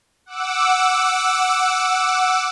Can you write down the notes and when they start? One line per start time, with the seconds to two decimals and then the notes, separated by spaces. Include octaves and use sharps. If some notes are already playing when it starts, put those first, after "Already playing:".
0.26 F#5 D6 E6